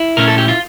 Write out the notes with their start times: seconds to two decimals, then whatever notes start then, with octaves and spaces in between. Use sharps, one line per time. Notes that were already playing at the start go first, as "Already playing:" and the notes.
Already playing: E4
0.17 A#2 A3 C#4 A#4
0.27 A4
0.38 G4
0.48 F4